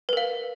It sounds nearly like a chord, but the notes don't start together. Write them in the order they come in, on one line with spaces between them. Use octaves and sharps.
B4 A#4 F5